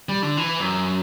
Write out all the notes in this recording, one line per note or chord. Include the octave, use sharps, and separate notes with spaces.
G3
D3
E3
F#2